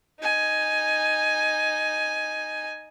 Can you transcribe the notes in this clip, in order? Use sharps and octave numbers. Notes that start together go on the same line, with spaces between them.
D#4 G#5